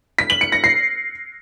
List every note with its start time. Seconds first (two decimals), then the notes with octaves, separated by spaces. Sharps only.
0.19 B6
0.30 F#7
0.41 C#7
0.52 A#6
0.64 C7